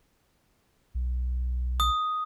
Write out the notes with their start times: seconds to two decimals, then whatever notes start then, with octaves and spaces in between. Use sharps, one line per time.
0.95 B1
1.80 D#6